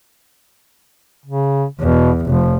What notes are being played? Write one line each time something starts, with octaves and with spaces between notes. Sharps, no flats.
C#3
E2 B2
F1 F3